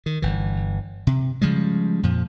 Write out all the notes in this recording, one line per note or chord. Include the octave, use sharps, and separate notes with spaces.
D#3
G1 E3
C3
C#3 F3 G3 G#3
F2 A#2 F3